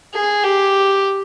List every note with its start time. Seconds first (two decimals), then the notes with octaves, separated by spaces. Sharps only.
0.15 G#4
0.44 G4